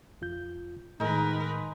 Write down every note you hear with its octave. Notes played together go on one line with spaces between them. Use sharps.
F2 F4 G6
A2 D#3 G#3 D#4 A#4 B4